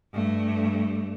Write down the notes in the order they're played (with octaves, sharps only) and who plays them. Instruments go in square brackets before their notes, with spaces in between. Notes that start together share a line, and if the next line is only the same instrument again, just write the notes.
[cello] G2 A3